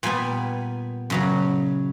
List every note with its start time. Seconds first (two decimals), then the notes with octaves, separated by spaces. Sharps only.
0.03 A#2 G3 B3 G#5
1.10 F#2 C#3 F#3